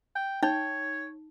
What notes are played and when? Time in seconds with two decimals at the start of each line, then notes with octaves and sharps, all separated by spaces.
0.16 G5
0.43 D#4 C#5 G5